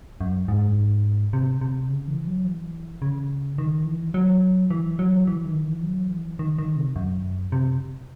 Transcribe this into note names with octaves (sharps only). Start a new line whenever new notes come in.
F#2
G#2
C3
C3
C#3
E3
F#3
E3
C#3
D#3
E3
F#3
E3
F#3
E3
D#3
E3
F#3
E3
D#3
D#3
C3
F#2
C3